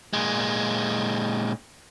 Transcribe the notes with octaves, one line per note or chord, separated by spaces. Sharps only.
A#2 G#3